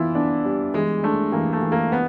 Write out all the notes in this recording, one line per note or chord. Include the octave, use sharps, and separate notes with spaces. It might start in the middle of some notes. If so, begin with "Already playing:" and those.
Already playing: E3 B3 E4 F4
B3 D4
G3
E3 G#3
A3 D4
E3 A#3
A3
E3
A#3
B3